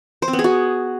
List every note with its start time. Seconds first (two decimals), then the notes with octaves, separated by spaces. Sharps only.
0.22 C5
0.28 C4
0.33 B3
0.39 G#4
0.44 F#4